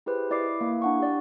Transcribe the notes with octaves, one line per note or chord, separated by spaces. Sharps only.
E4 G4 G#4 B4 C5
E4 D5 D#5 D6 C7
A#3 E4
D4 F#5 C#6
G4 D5